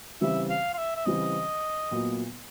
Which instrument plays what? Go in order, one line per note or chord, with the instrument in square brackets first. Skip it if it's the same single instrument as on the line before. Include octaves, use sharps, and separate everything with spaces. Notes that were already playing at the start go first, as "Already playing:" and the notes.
[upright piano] C#3 E3 G3 C4 [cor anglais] E5
[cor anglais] F5
F5
E5
E5
[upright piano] C#3 E3 G3 C4 [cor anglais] D#5
[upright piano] A#2 F#3 B3